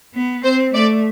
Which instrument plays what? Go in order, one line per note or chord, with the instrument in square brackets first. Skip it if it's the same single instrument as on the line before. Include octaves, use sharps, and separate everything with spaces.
[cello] B3
[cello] C4 [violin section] C5
[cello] A3 [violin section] D5